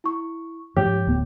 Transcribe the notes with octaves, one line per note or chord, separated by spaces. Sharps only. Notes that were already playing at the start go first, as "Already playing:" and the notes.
E4 C#6
G#2 F3 G4 C#5
D1 B3